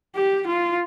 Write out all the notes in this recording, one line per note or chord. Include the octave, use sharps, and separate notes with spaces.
G4
F4